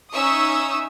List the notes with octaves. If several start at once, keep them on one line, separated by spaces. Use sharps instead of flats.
C#4 D#4 E5 C#6 D#6 E6